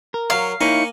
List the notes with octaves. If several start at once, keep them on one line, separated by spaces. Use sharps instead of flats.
A#4
F#3 C#5 F5
A#3 D#4 E4 C#5 G#5 C#7